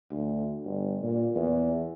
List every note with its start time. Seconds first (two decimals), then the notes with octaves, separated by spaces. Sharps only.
0.10 D2
0.66 G1
1.02 A#2
1.35 E2